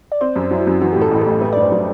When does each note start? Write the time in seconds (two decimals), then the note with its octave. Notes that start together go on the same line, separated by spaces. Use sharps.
0.12 D5
0.21 C4 C5
0.36 F#2
0.51 F#3 E4
0.61 F#4
0.67 F#2
0.81 E3 F#4
0.93 A2 G4
1.02 A4
1.11 A1
1.21 A4
1.27 A1
1.41 A3 B4
1.53 G2 D5
1.62 C5
1.72 F#3